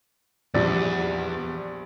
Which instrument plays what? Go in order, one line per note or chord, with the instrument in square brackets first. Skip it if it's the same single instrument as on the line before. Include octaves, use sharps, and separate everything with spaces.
[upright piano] A#1 G3 [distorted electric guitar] E2 [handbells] D5